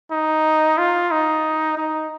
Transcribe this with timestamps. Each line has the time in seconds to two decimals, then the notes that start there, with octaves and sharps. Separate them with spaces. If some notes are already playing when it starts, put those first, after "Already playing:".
0.11 D#4
0.78 F4
1.11 D#4
1.78 D#4